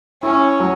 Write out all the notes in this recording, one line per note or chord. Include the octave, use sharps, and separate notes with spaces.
C#4 E4
F#3